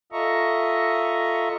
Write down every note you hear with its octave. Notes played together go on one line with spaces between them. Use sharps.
F4 A4 D#5 E5 A#5 C#6